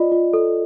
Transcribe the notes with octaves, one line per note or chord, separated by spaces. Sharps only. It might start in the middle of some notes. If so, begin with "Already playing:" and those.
Already playing: F4 D5 D#5
F4
A4